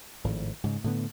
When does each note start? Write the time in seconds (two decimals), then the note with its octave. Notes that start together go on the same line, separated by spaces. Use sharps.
0.24 G#1 A2 F3
0.64 G#2 C#3
0.84 A2 D3 B3